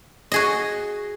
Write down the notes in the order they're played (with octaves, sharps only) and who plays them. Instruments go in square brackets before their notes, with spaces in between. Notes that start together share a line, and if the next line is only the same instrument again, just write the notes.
[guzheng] F#4 G#4 D#5